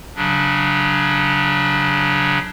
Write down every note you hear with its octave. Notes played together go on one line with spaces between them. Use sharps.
C#3 F#3 D4